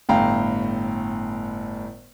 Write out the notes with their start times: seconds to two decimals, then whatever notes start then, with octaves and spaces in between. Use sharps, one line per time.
0.09 G1 A2 F5 G5 A#5